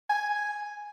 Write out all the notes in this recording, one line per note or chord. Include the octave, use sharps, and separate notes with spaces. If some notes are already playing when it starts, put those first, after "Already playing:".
G#5